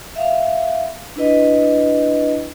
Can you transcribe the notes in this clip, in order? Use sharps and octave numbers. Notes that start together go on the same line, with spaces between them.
E5 F5
D4 E4 B4 D#5